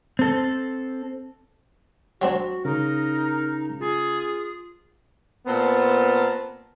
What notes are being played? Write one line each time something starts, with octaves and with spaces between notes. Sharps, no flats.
C4 A4
F#3 C4 D4 F#4
C#3 D#4 A#4
F4 G#4
A#2 B3 C4 A#4 A5